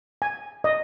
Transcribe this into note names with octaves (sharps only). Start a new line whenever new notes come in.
G#5
D#5